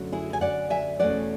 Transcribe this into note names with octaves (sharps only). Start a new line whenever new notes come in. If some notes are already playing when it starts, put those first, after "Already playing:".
Already playing: F#2 D3 F#3 A3
E4 G#4
G#5
D5 F#5
E5 G#5
E2 B2 A3 C#4 D5 F#5